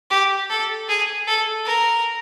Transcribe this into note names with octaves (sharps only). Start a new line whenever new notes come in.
G4
A4
G#4
A4
A#4